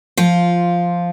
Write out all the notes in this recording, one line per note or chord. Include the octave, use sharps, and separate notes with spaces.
F3 F4